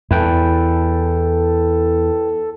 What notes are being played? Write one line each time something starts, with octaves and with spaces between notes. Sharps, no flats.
E2 E4 A4 B4 G5